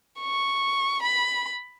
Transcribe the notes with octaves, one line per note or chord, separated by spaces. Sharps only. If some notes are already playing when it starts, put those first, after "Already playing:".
C#6
B5